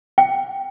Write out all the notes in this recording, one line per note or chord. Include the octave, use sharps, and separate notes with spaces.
G5